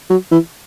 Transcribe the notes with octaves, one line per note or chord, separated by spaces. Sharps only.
F#3
E3